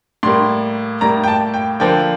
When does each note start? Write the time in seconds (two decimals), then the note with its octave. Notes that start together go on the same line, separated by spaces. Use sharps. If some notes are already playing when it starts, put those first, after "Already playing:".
0.23 A2 G3 A#3 C6
1.01 A2 G3 A#3 A#5
1.24 G5
1.28 A5
1.54 G5
1.80 D3 F3 A#3 G5